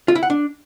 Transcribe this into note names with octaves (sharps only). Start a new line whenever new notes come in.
F4
E4
F#5
D4